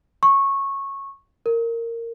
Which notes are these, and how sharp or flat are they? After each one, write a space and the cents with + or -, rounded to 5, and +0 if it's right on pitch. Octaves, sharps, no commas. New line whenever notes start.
C#6 -15
A#4 -15